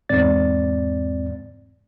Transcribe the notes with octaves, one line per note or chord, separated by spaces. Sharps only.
E2 G#2 C4 D5 A6